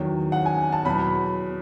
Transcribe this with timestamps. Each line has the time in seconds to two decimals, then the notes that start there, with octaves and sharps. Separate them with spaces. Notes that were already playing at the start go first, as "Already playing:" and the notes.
Already playing: E2 D#3 F#3
0.32 F#5
0.46 G#5
0.72 A5
0.85 E2 B2 F#3 B5